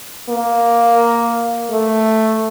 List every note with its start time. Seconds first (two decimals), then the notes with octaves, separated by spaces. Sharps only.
0.29 A#3
1.71 A3